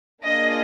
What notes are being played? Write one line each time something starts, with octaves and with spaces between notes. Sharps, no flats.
A#3 D4 F4 G#4 D#5